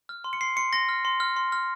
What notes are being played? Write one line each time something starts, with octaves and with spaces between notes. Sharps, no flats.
F6
C6
C#7
C6 C7
C6 C#7
C6 A#6
F6
C6
F6
C6
F6